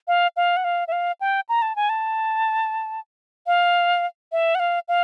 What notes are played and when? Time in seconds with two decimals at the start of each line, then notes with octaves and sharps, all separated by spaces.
0.08 F5
0.36 F5
0.57 F#5
0.64 F5
0.88 E5
0.92 F5
1.21 G5
1.49 A#5
1.62 A5
1.76 G#5
1.89 A5
3.47 F5
4.32 E5
4.55 F#5
4.60 F5
4.88 F5